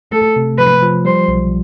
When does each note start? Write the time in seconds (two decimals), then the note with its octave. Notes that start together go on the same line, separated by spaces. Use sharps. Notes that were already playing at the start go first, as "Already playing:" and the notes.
0.12 A3 A4
0.36 C3
0.58 F3 B4
0.82 F3
1.05 G3 C5
1.28 B1